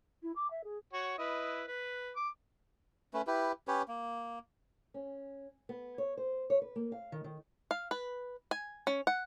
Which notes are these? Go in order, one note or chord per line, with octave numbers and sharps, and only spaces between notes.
E4
D6
E5
G#4
F#4 C#5
E4 B4 D#5
B4
D6
A3 C#4 B4
E4 G4 B4
C#4 G4 B4 C#5
A#3
C#4
B3
C#5
C5
C#5
B4
A#3
F5
D#3
D#3
F5
B4
G#5
C#4
F#5